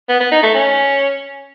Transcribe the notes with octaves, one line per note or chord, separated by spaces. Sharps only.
B3
B3
D#4
A3
C#4